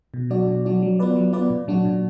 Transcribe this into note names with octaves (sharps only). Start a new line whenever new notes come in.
B2
F#3 D4 F#4 D5
B2
F#3 D4 F#4 D5
F#3
B3 F4 B4 D5
F#3
B3 F4 B4 D5
A#2
F#3 D4 F#4
A#2